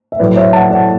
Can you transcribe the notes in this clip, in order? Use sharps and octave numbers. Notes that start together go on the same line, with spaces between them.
E5
A2 F#3 B4 D5
C#5 E5
F#5 A5
D5 F#5